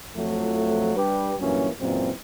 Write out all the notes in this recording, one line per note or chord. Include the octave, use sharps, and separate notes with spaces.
F2 F3 F#3 A3
G3 D4 G4 B4
G2 A#2 E3 F#3 A#3 C#4
F#2 A#2 E3 G#3 C4